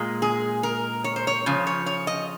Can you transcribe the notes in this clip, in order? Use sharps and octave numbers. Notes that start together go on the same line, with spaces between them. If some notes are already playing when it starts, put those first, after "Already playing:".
Already playing: A#2 G#3
G#4
A#4
C#5
C5
C#5
C#3 F3
C#5
C#5
D#5